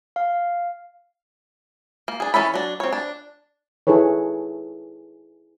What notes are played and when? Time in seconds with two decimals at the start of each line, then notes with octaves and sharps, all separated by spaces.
0.16 F5
2.08 A#3
2.20 D4 G#4
2.34 E3 A#3 C#4 A4 B5
2.54 F#3 D4
2.80 C4 C#5
2.93 D4
3.87 D#4 E4 G#4 A4 B4 C#5